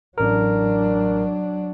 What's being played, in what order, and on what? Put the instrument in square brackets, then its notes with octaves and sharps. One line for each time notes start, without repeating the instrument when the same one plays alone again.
[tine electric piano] A1 A#4 [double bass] F#3 D4